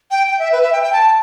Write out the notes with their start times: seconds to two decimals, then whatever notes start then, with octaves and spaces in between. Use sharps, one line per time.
0.11 G5
0.28 G5
0.39 E5
0.52 B4
0.63 E5
0.73 G5
0.83 G5
0.93 A5